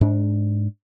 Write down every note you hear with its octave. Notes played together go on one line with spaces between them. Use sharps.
G#2 D4